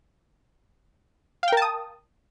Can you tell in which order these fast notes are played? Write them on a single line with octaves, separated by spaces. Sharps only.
F5 G5 A#4 A5 D#6